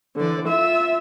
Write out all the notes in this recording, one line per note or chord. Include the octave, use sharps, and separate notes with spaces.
D3 E3 D5
F4 E5 E6